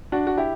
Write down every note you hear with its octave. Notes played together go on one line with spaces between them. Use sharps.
D4 F#4
F#4
E4 G4